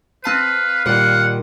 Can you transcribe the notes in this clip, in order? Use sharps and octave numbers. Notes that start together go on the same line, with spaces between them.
C4 B4 F5 A5 D#7
A#2 D#3 G3 F#5